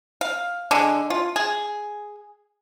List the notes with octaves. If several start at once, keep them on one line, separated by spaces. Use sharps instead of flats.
F5
D3 G#3
F4
G#4